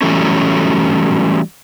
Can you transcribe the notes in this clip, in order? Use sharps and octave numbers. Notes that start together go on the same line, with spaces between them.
E3 F#3 G3 A3 C#4